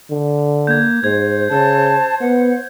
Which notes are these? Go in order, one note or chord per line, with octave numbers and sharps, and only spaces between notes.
D3
A#3 G6 G#6
G#2 C5 G#6
C#3 A5
B3 F#5